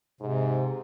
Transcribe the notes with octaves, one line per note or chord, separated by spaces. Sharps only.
G#2 C3